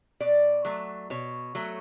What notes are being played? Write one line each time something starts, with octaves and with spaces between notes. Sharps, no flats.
B2 D5
F#3 A3
B2 C#5
F#3 A3